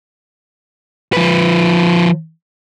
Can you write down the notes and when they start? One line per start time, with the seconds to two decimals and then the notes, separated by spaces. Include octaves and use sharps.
1.13 F3 B4